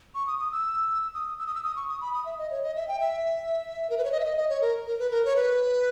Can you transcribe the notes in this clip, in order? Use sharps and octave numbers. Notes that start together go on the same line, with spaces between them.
C#6
D#6
D#6
E6
D#6
E6
D#6
E6
D#6
C#6
D#6
B5
D#6
E5
D#5
C#5
D#5
E5
G5
E5
A#4
B4
C#5
D#5
E5
D#5
D#5
C#5
A#4
A#4
B4
A#4
C#5
B4